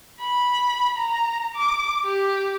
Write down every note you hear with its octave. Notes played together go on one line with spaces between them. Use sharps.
B5
A#5
D6
G4